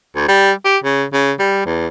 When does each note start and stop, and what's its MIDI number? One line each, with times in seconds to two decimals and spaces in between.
0.16 0.24 38
0.28 0.51 55
0.65 0.77 67
0.84 1.04 49
1.13 1.32 49
1.39 1.63 55
1.66 1.87 40